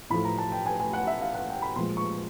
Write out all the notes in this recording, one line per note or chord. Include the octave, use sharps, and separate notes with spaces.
A2 F3 A3 B5
A#5
A5
G5
G#5
G#5
F#5
E5
F5
F#5
G5
B5
A#2 F3 G#3 C6
C#6